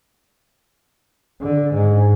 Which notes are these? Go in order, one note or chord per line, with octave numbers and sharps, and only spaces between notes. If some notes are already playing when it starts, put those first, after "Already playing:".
D3
G#2